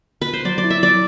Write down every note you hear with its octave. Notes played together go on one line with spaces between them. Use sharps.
B4
C5
F#3 D5
D5
E4
E5
F#3 D5